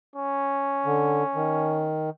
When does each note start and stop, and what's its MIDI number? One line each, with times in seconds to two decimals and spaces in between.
0.16 1.96 61
0.86 1.23 50
1.35 2.10 51